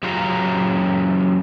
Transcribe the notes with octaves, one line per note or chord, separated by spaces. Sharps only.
F#2 C#3 F4 G4 F5 A#5